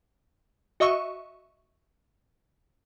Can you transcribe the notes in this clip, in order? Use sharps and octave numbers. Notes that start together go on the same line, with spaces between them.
F#4 D#5 E5 C#6